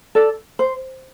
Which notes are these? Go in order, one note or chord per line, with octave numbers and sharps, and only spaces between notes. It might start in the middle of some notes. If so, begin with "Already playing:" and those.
A4 D5
C5